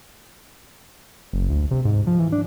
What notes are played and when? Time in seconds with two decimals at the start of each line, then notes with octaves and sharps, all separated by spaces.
1.33 F#1
1.49 D2
1.71 C3
1.85 G#2
2.07 F3
2.19 E3
2.32 D4